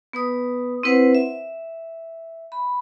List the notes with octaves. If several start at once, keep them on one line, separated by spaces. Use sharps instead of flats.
B3 B4 D#6
C4 E4 B4 C5 F#5
E5
B5